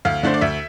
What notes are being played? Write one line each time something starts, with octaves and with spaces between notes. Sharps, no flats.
D2 F5
D3 A3 D4 C5
D5
D2 E5